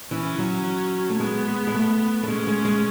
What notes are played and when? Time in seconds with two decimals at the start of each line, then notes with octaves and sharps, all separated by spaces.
0.11 E3 C#4
0.38 F#3
1.10 A3
1.19 G#3 B3
1.47 G#3
1.67 G#3
1.74 A3
2.23 A3
2.28 G#3 C#4
2.47 G#3
2.65 G#3